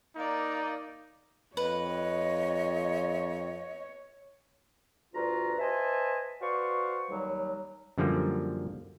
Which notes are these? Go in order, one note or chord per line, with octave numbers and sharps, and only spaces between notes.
A#3 D#4 D5
F2 B4 C#5 D#5
D2 G2 F4 F#4 A#5
B4 C5 D#5 E5 G#5 A5
F#4 B4 C5 D5 F5 C#6
D#2 F#3 G3
F#2 D3 F3 G3 A#3